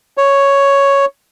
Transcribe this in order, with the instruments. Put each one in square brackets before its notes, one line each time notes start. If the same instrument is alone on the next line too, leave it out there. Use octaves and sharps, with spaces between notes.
[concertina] C#5